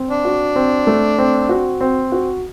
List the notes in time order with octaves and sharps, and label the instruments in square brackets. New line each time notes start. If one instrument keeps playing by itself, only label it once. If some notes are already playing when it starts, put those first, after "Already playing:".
Already playing: [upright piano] C4
[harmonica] D4
[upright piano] F#4
C4
A3
C4
F#4
C4
F#4